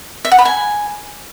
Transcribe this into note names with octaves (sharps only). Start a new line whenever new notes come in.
E5
F#5
B5
G#5